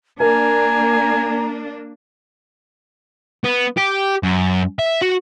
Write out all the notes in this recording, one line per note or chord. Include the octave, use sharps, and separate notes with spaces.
A#3 D4 A#4 G#5 A#5
B3
G4
F#2
E5
F#4